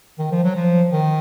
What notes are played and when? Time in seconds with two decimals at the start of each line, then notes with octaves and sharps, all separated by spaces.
0.18 D#3
0.31 F3
0.44 F#3
0.56 F3
0.92 D#3